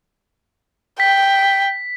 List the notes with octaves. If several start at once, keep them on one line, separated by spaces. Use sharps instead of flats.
G5 B6